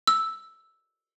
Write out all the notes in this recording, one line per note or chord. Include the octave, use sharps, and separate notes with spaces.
E6